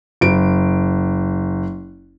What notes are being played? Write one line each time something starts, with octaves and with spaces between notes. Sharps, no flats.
F#1 D7